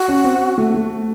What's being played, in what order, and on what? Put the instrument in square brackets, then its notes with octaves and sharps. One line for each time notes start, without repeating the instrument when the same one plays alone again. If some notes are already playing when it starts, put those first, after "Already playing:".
Already playing: [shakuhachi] F#4
[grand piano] C#4
C4
A3
A3